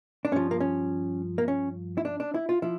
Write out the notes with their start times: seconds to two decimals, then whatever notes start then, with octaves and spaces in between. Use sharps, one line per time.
0.25 D4
0.31 G2 F3 C#4
0.51 A#3
0.60 C#4
1.38 A#3
1.48 C#4
1.97 E4
2.05 D4
2.20 D4
2.34 E4
2.49 F4
2.62 F3 E4